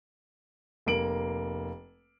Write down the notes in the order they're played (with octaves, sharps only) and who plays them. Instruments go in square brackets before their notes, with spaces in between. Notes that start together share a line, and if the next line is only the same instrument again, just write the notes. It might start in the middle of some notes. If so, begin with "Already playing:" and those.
[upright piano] F1 A#3 D7 F#7